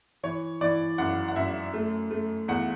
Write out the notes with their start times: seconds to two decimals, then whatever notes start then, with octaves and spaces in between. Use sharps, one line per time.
0.23 E3 C#5
0.61 E3 D5
0.98 F#2 F#5
1.28 F#5
1.36 F#2 E5
1.74 A3
2.11 A3
2.48 E2 F#5